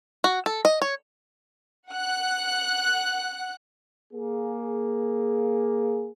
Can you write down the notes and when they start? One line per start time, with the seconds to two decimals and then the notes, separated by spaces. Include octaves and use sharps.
0.24 F#4
0.46 A4
0.65 D#5
0.82 C#5
1.88 F#5 F#6
4.14 A#3 G#4